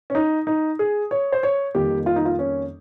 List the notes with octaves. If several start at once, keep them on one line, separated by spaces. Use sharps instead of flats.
C#4
D#4
D#4
G#4
C#5
C5
C#5
F2 D#3 G3 A#3 G4
F4
D#4
F4
C#4